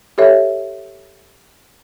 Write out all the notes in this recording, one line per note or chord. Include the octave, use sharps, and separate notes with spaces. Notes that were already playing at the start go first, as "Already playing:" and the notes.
G4 A4 C#5 E5